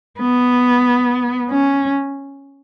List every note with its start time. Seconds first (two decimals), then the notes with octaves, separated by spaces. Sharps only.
0.20 B3
1.50 C#4